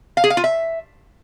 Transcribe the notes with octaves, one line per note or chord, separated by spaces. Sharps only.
F5
G#4
F5
F4
E5